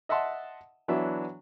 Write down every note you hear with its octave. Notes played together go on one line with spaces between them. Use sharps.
D#5 E5 F#5 A5 C6
E3 F#3 B3 D4 E5